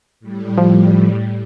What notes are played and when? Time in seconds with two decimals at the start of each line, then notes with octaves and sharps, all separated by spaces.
0.20 A2 G3
0.58 F3